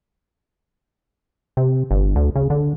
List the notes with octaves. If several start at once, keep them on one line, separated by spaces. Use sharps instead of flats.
C3
G1
D2
C#3
D3